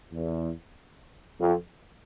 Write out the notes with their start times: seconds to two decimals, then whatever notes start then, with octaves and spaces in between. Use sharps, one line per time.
0.12 E2
1.41 F2